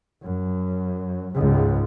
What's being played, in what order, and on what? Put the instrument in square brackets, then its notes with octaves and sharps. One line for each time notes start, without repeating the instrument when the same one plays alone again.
[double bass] F#2
C#2 G#2